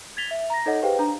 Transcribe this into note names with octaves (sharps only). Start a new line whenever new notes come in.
G#6 A6 B6 F7 G7
E5
A#5 A#6
D#4 A4 C#5 D#5 F#5
G4 G#4 B4 C5 F5 G5
D4 A#5